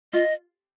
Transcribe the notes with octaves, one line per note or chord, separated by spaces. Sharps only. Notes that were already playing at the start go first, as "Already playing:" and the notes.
F4 D#5